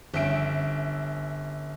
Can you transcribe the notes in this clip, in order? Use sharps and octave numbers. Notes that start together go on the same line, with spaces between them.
G1 C#4 E5 D7